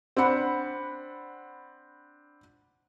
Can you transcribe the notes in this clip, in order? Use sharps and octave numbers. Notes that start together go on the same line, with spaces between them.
C4 D4 F#5 B5